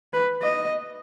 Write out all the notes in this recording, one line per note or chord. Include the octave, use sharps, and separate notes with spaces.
B4
D#5